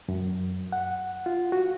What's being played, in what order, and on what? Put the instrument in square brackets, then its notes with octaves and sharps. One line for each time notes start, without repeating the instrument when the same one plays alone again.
[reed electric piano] F#2
F#5
F4
F#4